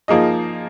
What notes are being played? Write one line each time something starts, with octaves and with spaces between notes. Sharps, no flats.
F3 A#3 D#4 G#4 D#5